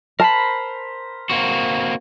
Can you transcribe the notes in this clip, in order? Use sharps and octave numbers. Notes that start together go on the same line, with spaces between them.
A#4 C5 A5 B5
A#3 C4 F#4